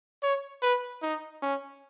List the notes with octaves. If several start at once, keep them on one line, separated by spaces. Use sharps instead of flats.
C#5
B4
D#4
C#4